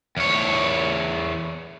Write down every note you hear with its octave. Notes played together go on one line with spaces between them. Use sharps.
E2 C#5